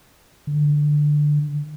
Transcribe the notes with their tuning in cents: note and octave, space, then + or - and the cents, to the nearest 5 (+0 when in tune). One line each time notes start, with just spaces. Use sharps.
D3 +10